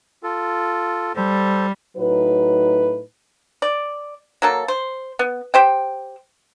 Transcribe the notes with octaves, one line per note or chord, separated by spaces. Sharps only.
F4 A4
G3 A4 C5
A2 F#3 D#4 B4
D5
F#3 A#3 A4
C5
B3
G4 C5 G5